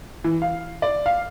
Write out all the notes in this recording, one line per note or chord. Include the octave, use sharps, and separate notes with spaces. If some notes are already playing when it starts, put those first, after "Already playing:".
E3
F5
D5
F5